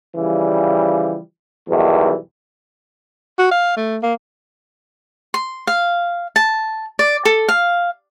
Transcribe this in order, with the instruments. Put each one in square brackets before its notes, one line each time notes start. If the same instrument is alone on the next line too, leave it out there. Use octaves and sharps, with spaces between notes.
[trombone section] C#3 E3 F3 G3
B1 E2 D#3 E3 G3
[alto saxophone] F#4
F5
A3
A#3
[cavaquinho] C6
F5
A5
D5
A4
F5